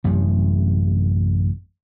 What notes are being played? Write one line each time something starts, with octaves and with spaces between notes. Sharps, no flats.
A1 F#2 C3 G3